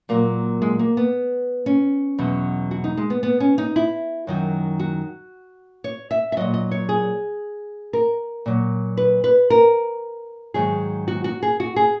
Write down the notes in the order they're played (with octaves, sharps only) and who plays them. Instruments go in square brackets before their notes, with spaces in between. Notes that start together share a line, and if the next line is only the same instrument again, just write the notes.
[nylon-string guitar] A#2 F#3 A#3
G#3
A#3
B3
C#4
E2 B2 F#3
F#4
D#4
G#3
B3
B3
C#4
D#4
E4
F#2 D#3 F#3
F#4
C#5
E5
E5
A#2 F#3 D#5
D#5
C#5
G#4
A#4
A#2 F#3
B4
B4
A#4
G#2 D#3 F#3 G#4
F#4
F#4
G#4
F#4
G#4